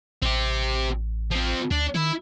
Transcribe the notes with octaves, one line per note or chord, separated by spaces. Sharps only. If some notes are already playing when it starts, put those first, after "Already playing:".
A1 C4 G4
F3 C4
D2 D4
D#3 E4